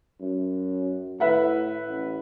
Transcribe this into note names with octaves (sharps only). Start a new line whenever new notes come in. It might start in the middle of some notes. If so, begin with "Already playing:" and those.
F#2
A2 B4 E5 F#5
A1